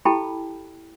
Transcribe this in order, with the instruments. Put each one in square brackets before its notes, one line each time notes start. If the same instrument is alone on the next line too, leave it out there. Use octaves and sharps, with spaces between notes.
[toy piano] E4 G4 A4 G5 A5 B5